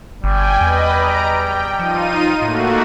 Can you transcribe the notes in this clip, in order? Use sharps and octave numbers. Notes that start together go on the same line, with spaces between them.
G1 G3 G5 G#5
E2 B4 D#5 B5
A#5 D7
G5
F3 D#4 F4 D#7
A2 A3 A#3 F#4